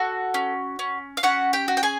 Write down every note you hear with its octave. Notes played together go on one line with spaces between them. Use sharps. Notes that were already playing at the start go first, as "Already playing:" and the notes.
Already playing: F#4 A4
C#4
C#4
F5
C#4 F#4 F#5
G4 G5
F#4
G5
G#4 G#5